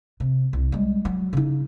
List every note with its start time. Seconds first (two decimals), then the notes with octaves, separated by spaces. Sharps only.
0.20 C3
0.53 C2
0.72 G3 G#3
1.05 F#3
1.33 C#3 D#4